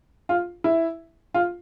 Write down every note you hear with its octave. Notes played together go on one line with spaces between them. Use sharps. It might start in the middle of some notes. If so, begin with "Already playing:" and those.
F4
E4
F4